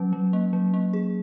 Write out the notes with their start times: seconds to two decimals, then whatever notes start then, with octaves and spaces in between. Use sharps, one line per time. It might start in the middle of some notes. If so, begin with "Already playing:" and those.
Already playing: F#3 C#4
0.13 F#3
0.33 A#3
0.53 F#3
0.74 A#3
0.93 G#4